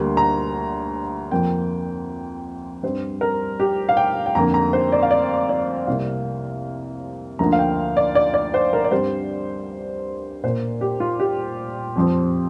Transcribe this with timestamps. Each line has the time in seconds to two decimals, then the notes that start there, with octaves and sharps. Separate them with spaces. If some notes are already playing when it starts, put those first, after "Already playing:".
Already playing: D2 D3 G3 A#3
0.17 A#5
1.31 F2 F3 A#3 G5
2.83 G2 G3 C4 C5
3.21 A#4
3.60 G4
3.89 F5
3.97 G5
4.26 G5
4.35 F2 D3 A#3 A#5
4.54 A#5
4.73 C5
4.92 D5
5.02 F5
5.11 D5
5.49 D5
5.87 C2 C3 A#3 F5
7.39 D2 D3 F3 A#3 A#5
7.52 F5
7.59 G5
7.97 D5
8.15 D5
8.34 D5
8.54 C5
8.73 A#4
8.84 D5
8.91 G2 G3 C4 C5
10.44 A#2 A#3 C5
10.81 G4
11.00 F4
11.20 G4
11.96 F2 F3 C4